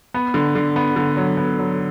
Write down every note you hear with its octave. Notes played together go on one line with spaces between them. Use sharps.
B3
D3
D3
B3
D3
F#3
B3
F#3